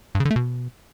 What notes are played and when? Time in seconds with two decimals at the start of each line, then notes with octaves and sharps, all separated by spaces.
0.15 G2
0.20 C#3
0.25 D3
0.31 A3
0.36 B2